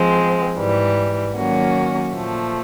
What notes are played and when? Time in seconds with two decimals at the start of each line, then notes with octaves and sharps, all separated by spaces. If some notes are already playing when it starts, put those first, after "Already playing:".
Already playing: F3 G#3 C4
0.57 G#2 E3 G3
1.35 D#3 F#3 A#3 C#4 F#4
2.14 A#2 F3 A3